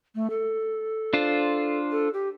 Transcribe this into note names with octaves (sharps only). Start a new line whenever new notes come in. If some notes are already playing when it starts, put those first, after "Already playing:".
A3
A4
D4 F4 C5
A4
G4